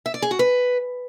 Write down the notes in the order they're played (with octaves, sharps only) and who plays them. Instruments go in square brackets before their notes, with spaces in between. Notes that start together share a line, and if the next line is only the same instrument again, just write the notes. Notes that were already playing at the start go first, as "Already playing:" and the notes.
[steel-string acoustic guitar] E5
D5
G#4
F#4
B4